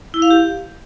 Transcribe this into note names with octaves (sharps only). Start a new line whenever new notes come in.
E4
F5
G4